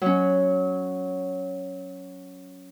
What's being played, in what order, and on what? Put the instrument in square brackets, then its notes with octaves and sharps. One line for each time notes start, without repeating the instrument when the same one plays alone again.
[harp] F#3 C#4